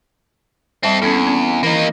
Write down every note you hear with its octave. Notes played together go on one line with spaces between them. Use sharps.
G3 C4 A4 E5
E2 C#4 A4
C4
C#4
E3 A#3 D#4 E4